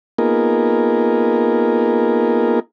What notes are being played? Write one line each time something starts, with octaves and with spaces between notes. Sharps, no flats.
A#3 B3 D#4 F4 G#4 A#4